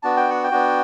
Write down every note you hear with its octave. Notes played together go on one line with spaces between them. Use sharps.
B3 D4 F#4 A5
G5
F#5
G5
B3 D4 F#4